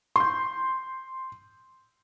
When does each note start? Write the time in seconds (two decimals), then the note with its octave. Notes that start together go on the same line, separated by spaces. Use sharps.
0.16 C6 G6